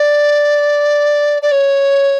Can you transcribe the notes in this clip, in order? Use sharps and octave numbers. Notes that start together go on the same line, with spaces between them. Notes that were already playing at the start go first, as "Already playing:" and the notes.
Already playing: D5
D5
C#5